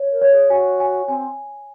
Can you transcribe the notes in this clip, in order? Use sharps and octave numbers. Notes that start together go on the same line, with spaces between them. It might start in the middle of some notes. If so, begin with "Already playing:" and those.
Already playing: C#5
A#4
C#5
G#4
F#4 G#5
G#5
C4 G#5